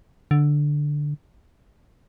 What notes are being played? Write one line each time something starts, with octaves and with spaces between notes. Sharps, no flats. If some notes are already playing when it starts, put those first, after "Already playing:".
D3